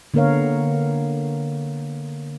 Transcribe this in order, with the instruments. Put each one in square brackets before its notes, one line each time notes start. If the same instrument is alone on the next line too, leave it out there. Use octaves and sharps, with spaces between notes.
[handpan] D3 A#3 B3 A#4 C#5 F5